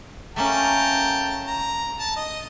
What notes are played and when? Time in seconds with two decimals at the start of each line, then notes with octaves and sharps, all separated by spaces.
0.36 A3 A#3 C#4 G5 A5 A#5
1.47 A#5
1.99 A5
2.17 D#5